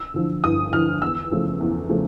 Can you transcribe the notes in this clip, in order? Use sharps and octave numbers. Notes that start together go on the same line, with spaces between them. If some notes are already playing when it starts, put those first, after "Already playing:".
Already playing: E6
D3 F3
G2 D#6
D3 F3 F6
E2 E6
C#3 F3 A3
E2
C#3 F3 A3